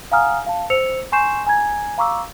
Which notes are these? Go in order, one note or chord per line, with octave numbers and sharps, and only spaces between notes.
F5 F#5 G#5 A#5 D#6 F6
F5 A5
C5 E6 C#7 F7
G#5 C6 C#6 G6 C7 E7
G#5 A#5 G#6
F5 A#5 C#6 D6 E6